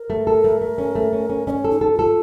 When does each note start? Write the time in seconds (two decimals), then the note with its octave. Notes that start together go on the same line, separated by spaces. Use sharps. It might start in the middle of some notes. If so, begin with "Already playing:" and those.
Already playing: A#4
0.10 A3
0.27 A4
0.44 A3
0.61 A3
0.78 C#4
0.95 A3
1.13 C#4
1.30 C#4
1.47 C#4 C#5 D#5
1.64 A4
1.70 D#4
1.81 A4
1.93 F4
1.99 A4